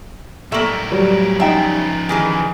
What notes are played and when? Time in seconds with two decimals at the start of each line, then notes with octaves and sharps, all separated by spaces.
0.52 A2 A#3 A4 A#4 E5 C#6 F#7
0.92 F#3 G3
1.40 C#3 F3 D#4 E5 G5 A#5
2.09 D#3 E3 G#4 G#5